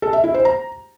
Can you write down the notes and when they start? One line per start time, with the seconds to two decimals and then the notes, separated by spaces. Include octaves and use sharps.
0.02 A4
0.13 E5
0.24 E4
0.34 C5
0.45 A#5